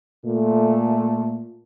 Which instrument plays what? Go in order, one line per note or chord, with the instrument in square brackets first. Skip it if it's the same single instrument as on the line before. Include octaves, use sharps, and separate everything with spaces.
[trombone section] A#2 A3